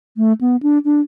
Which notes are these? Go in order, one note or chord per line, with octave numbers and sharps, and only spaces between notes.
A3
B3
D4
D4